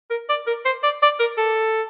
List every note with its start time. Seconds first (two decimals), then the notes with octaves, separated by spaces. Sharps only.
0.10 A#4
0.29 D5
0.47 A#4
0.65 C5
0.83 D5
1.02 D5
1.20 A#4
1.38 A4